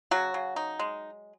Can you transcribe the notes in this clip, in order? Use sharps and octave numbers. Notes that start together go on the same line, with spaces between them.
C#3 F#3 F#4
C#3
D#4
G#3